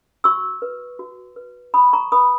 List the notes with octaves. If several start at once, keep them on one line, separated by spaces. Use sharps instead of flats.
F#4 C#6 E6
B4
F#4
B4
F#4 B5 D#6
A#5 C#6
B4 B5 D#6